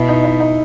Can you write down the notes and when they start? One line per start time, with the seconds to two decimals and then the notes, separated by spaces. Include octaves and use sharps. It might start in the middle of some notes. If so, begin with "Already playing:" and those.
Already playing: B2 E4
0.08 D#4
0.24 E4
0.40 D#4